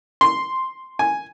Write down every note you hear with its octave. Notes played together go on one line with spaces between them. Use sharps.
C6
G#5